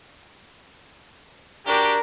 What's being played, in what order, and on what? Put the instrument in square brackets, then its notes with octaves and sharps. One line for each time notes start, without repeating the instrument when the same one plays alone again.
[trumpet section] D4 F#4 G4 [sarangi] A#4